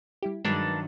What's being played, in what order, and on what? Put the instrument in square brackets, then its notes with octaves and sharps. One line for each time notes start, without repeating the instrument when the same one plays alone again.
[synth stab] G3 E4 G4
[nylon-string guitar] G2 D#3 F#3 [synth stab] G#3 B4 B5 [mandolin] A#3 D4